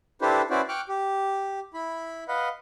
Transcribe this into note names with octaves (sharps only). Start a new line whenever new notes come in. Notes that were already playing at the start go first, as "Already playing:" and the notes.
D4 E4 G4 A4 B4 C5
C#4 E4 F#4 B4 C5 D5
G5 C#6 D6 F6 F#6
G4
E4 B5
B4 D#5 F5 F#5 B5